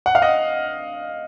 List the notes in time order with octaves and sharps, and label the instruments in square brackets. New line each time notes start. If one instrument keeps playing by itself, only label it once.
[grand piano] F#5
F5
D#5 F#5